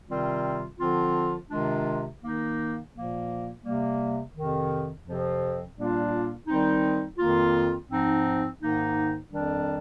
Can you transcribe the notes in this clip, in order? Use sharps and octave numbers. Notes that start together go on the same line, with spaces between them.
C3 D#3 G3 C4 F4
D3 F3 C4 F4
C3 D#3 G#3 D4 F4
D#3 A#3 D#4
A#2 F3 A#3
C3 G3 A#3
F2 C3 D#3
F2 C3 F3 C4
A#2 G3 A#3 D4 F4
D#3 G3 C4 D#4
F2 D#3 A#3 F4
G#2 F3 C4 D#4
G#2 D#3 A#3 D#4
F2 D#3 G3 D4